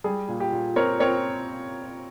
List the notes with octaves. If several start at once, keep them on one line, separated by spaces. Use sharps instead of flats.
G3 G#4
A#2
G4
A#2
C4 A#4 C#5
C4 A#4 C#5